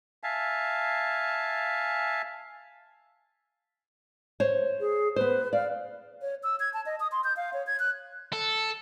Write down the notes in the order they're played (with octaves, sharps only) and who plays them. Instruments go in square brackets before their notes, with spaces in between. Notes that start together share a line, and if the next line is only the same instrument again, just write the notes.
[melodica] E5 F5 G#5 A5
[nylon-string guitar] C5 C#5
[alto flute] G#4
[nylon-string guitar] B3 C5 [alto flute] B4
[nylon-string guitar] D5 [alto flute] F5
[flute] C#5
E6
G#6
A5
D#5
D#6
C6
G6
F5
C#5
G#6
F#6
[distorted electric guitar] A4